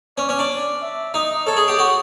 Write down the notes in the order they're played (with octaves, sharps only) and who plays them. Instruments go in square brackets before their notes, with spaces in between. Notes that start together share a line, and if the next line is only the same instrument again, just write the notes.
[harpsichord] C#4 [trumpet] D5
[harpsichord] C#4
D4
[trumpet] E5
[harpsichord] D#4 [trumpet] D#5
[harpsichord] A4 [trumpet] C#5
[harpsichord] G#4
G4
F#4